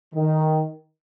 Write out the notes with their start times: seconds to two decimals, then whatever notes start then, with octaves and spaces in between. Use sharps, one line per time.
0.14 D#3